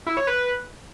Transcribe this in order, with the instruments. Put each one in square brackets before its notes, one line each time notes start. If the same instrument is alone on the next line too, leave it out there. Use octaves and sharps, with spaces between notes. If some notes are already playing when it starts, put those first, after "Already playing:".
[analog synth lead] E4
C#5
B4